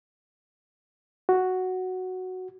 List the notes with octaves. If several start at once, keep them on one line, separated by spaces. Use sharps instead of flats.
F#4